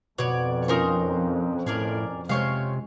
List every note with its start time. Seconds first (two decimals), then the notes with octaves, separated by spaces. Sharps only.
0.18 F2 B2 C#5 D5
0.68 C#4 D#4 F4 A#4 C5
1.67 A2 G#4 A#4 D5
2.29 C3 G#3 C5 C#5 F5